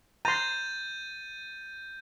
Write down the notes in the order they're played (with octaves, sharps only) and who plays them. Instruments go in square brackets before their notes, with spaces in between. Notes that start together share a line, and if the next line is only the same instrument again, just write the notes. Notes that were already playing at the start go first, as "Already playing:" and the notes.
[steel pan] A#5 C6 [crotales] G6 A6 D#7